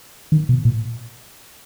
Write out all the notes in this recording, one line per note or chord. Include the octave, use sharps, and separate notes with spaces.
D#3
B2
A#2